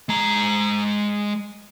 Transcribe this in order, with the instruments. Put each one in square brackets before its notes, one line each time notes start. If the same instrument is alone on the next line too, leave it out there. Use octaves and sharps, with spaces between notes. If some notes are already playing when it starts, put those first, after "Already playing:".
[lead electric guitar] G#3 A#5